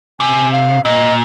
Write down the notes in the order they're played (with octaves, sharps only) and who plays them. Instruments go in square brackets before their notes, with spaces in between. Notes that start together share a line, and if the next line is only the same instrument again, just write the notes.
[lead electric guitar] C3 [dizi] G#5
[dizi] F5
[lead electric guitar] A#2 [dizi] D#5